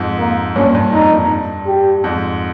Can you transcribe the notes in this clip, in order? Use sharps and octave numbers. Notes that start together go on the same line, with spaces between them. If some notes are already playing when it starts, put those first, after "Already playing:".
Already playing: F2 G#2
A#3
G2 A#2 C#4
G2
F2 D#4
G2
G4
F2 G#2